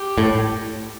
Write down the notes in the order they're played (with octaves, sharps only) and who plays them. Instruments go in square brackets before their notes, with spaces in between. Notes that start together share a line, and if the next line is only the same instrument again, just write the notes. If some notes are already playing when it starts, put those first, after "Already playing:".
Already playing: [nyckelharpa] G4
[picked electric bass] A2